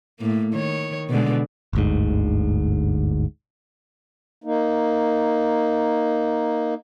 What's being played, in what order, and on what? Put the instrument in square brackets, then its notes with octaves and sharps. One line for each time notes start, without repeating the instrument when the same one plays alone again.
[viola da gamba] A2 A#3
D#3 C#5
B2 D3 G#3
[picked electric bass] G1 D2 G#2
[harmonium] A#3 D#4